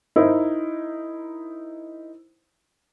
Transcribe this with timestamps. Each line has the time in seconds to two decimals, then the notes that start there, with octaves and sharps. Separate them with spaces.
0.16 D#4 E4 A#4 C5